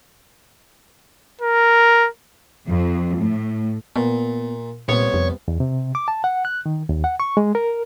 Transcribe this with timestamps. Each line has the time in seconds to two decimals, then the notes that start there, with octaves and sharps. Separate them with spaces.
1.41 A#4
2.67 F2
3.17 A2
3.96 A#2 B3
4.89 C2 A#2 B3 C#5
5.14 F2
5.48 E2
5.60 C3
5.95 D6
6.08 A5
6.24 F#5
6.45 F#6
6.66 D#3
6.89 D#2
7.04 F#5
7.20 C#6
7.37 G#3
7.55 A#4